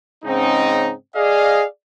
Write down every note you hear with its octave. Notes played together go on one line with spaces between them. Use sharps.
G#2 C#3 C4 C#4 D#4
G#4 D5 D#5 F5